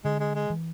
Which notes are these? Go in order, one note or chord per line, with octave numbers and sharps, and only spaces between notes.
D3 G#3
G#3
G#3
E3